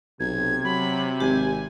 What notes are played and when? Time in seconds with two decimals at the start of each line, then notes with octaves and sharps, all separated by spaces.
0.20 B1 C3 G#6
0.64 F#3 B5
1.20 G#1 G4 G#5